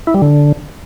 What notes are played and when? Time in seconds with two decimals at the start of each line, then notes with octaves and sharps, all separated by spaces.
0.07 E4
0.14 G3
0.22 D3